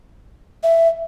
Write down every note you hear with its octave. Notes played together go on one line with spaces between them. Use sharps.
E5